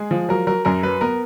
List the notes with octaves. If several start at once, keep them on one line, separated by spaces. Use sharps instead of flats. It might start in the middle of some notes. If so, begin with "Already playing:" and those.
Already playing: G#3 G#4
F3
F#3 A#4
F#3 A#4
F#2 A#4
F#3 B4
B3 A#4